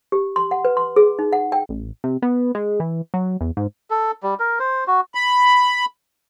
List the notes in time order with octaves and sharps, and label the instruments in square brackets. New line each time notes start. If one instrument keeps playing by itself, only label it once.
[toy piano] G4
C6
F#5
B4
C6
G#4
D#4
F#5
G5
[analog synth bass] A1
C3
B3
G#3
E3
F#3
E2
G#2
[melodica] A4
G3
A#4
C5
F#4
[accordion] B5